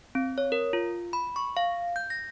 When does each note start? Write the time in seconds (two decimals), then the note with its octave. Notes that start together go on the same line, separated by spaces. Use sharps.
0.15 C4
0.38 C#5
0.52 A#4
0.73 F4
1.13 B5
1.36 C#6
1.57 F5
1.96 G6
2.10 A#6